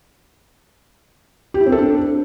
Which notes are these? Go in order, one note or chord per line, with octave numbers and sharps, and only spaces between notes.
G4
E4
C4
A4
D4